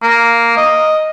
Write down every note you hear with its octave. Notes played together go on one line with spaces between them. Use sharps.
A#3
D#5